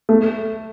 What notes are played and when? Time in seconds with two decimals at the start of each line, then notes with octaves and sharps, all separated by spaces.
0.09 A3